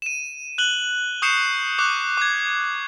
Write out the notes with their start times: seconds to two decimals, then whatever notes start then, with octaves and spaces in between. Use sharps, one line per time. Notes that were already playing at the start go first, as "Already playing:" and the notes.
0.02 D#7 E7
0.58 F#6 F#7 G7
1.22 C#6 D#6 G6 C7 C#7 E7
1.79 C#6 D6 F#6
2.17 D6 G#6